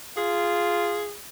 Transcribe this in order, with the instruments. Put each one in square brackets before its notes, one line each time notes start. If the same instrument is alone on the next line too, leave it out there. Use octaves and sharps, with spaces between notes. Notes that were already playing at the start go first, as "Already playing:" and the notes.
[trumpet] F4 [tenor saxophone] G#4